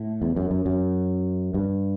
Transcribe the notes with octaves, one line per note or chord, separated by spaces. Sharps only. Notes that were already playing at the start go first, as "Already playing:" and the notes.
Already playing: A2
E2
F#2
F#2
F#2
G2